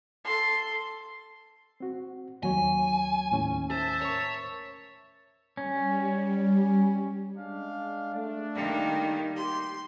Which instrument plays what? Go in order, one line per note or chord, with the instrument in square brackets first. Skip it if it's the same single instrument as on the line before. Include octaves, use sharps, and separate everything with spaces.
[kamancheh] A4 C6
[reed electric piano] C4 F#4
[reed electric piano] D#2 F#3 C#5 [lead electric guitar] G#5
[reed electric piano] D#2 A2 C#4
[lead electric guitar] C5 [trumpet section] E5 A5
[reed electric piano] A#4 C#6 [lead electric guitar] C#5
[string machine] G3 [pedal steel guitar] C#4
[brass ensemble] G#3 D4 F5
A3 D4
[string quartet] D#3 G3 A#3
[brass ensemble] G4 [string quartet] C6